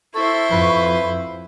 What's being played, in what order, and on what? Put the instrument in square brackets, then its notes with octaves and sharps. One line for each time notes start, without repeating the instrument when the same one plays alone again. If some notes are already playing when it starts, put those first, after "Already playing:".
[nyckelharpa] E4 C5 [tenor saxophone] A4 [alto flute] C#6
[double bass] F2 [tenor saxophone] B4